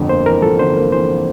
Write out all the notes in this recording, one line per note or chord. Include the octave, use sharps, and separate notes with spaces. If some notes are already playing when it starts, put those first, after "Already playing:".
Already playing: G1 F2
A#3 C5
E3 A#4
F2 A4
G1 C5
A#3
E3 C5